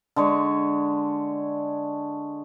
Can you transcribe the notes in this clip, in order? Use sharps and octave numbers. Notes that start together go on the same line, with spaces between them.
D3 G#3 C#5